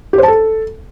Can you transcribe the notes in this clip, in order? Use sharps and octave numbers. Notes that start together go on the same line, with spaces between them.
G4
C5
A5
A4